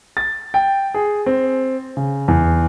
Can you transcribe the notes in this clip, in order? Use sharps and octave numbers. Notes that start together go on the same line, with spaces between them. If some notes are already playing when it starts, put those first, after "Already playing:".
A6
G5
G#4
C4
C#3
E2